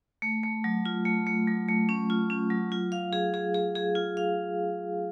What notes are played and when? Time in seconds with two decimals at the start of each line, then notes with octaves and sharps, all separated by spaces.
0.22 A3
0.43 A3
0.64 F#3
0.86 F4
1.05 A3
1.27 A3
1.48 F#3
1.68 A3
1.89 C#4
2.10 F4
2.30 C#4
2.50 F#3
2.72 F4
2.92 F5
3.13 G#4
3.34 G#4
3.54 G#4
3.75 G#4
3.95 F4
4.17 F5